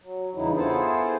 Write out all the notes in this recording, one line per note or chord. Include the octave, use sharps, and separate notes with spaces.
F#3
E2 G2 C#3 E3 D#4 E4
B3 E4 F4 G#4 A4 C5